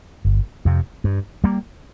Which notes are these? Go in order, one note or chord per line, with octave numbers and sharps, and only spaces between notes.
G1
F2 C3
G2
G3 A#3